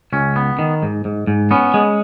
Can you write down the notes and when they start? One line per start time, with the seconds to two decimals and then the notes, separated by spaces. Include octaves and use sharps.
0.13 C#2 C#4
0.36 B3
0.59 D#3
0.83 G#2
1.05 G#2
1.27 G#2
1.51 B3 C#4
1.74 G#3